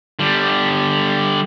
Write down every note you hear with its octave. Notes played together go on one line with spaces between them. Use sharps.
D3 G3